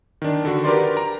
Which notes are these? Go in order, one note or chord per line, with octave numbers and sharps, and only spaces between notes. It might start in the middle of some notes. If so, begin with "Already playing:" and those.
D#3 D4
D3 F#4
G4 A#4 B4 D5 C6
A#5